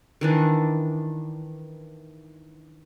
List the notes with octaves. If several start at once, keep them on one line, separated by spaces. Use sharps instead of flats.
D#3 E3 D4